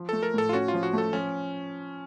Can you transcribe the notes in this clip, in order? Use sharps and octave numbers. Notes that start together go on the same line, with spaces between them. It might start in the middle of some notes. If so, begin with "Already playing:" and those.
Already playing: F3
A3 A4
A#4
A2 A4
F4
C#4 F#4
F4
F3
F#4
A3 A4
F3 C#4